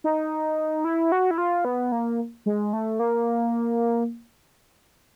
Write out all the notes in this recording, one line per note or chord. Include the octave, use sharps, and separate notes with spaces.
D#4
E4
F#4
E4
F4
B3
A#3
G#3
A3
A#3